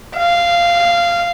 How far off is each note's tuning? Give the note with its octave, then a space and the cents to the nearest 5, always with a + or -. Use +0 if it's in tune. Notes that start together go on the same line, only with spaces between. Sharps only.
F5 -15